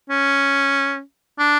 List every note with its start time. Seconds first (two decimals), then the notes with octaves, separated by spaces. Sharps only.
0.10 C#4
1.39 D4